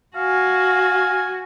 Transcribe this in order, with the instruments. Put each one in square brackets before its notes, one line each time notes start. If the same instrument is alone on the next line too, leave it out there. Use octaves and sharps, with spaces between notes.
[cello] F#4 [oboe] F5 [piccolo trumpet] G#5